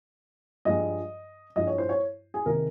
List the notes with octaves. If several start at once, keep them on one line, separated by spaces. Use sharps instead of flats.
G2 F3 G#3 D#5
G2 F3 G#3 D#5
C#5
C5
C#5
G#4
C3 D#3 G#3 A#4